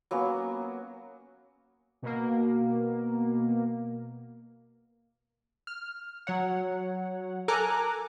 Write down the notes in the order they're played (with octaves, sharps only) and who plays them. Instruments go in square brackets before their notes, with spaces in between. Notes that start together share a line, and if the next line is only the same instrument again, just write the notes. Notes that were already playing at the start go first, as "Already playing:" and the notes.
[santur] F#3 A#3 B3 C#4
[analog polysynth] B2 A#3
F6
F#3 C#5 F#5
A4 A#4 G#5 A#5 D6 F#6